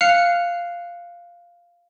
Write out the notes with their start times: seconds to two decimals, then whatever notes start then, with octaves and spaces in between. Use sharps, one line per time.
0.01 F5 F6 F#6 C7 C#7 F7